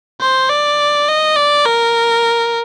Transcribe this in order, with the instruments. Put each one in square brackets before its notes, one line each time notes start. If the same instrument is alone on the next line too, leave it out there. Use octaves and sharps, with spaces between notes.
[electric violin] C5
D5
D#5
D5
A#4